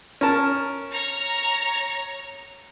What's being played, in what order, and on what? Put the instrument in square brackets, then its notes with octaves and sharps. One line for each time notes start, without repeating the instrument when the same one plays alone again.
[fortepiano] C#4 A#4 A5
[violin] C#5 A#5